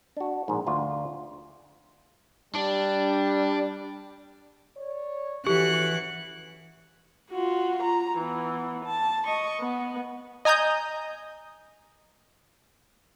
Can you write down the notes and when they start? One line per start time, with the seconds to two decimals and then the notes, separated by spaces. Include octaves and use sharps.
0.17 D4 F#4
0.48 A#1 G#2
0.67 D2 F4
2.55 G3 D4
4.77 C#5 D5
5.47 E3 C#4 F#4 G4 A4 F#6 C#7
7.30 F4 F#4
7.83 A#5
8.18 E3 B3
8.85 A5
9.25 D#5 C#6
9.60 B3
10.45 D#5 G#5 A#5 D#6 G6